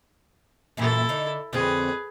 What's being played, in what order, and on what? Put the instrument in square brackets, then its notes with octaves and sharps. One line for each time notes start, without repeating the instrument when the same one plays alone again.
[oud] F#2 A#2 E3 [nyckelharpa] E4 A4
[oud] D3 D#4
[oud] F2 D3 C4 [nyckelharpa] G#4 B4